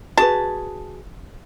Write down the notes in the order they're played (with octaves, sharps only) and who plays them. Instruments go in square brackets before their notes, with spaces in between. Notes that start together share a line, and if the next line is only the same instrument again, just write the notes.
[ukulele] F#4 G#4 B4 [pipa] A5